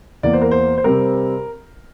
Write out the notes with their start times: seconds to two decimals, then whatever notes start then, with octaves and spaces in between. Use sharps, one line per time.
0.23 E2 E3 A#3 D5
0.33 C5
0.41 A#4
0.51 C5
0.78 C5
0.84 C3 G3 C4 A#4